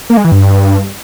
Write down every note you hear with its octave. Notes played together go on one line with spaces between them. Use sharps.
A#3
G#3
E3
G2